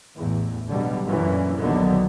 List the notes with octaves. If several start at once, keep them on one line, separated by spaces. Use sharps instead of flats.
A1 E2
B2 D3 F#3 G3
F#2 A#2 D3 E3 C#4
A#1 D#2 D3 D#3 F#3 B3